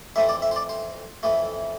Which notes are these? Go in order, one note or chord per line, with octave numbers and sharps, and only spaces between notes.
F2 E3 A3 C4 E5
D5
E5
C5
D5
C5
F2 E3 A3